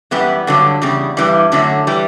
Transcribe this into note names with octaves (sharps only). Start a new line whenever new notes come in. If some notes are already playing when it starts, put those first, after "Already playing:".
F#2 E3 G3 B3
G2 D3 F#3
E2 C#3 G3
G2 E3 G3
F#2 D3 F#3 A3
E3 G3